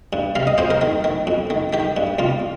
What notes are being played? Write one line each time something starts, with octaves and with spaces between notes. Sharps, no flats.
G2
C3 F5
D#5
F2 C5
A#4
D#3
D#3
F2
D#3
D#3 G4
G2
C2 F4